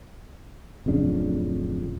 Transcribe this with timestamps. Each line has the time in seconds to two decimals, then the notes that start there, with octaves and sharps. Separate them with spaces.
0.86 D1 F2 C#3 D4